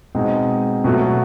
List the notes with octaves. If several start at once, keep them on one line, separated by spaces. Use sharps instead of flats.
B2 G#3 C4 D#4
B2 F#3 A3